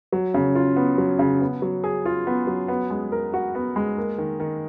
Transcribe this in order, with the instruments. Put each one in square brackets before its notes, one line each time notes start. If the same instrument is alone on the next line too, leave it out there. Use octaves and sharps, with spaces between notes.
[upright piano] F#3
C#3
F4
B3
F#3
C#3
B3
F#3
G#4
F4
B3
F#3
B3
G#3
A#4
F#4
B3
G#3
A#3
D#3
D#3